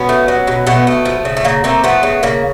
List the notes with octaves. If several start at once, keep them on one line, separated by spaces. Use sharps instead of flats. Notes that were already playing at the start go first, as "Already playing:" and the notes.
Already playing: B2 B3 C#4
A3
F#3
B2
B2 A3 B3
A3
F3
C#3
A3
C#3 A#3
A3 A#3 C4
F3 A3 B3
C#3
C#3 A#3